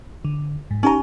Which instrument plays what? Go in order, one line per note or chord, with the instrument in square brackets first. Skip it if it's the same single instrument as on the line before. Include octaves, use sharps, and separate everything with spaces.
[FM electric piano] D3
G#2
[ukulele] C#4 A#5 [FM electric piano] D#4 G4